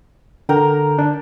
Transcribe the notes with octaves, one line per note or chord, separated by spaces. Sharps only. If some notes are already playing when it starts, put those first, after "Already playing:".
D3 A#4 G5 A#5
D4